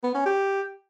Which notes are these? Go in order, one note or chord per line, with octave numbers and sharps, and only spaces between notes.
B3
C#4
G4